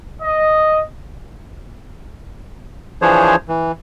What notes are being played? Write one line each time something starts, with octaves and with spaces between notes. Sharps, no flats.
D#5
E3 F3 D4 G#4 C5 C#5
E3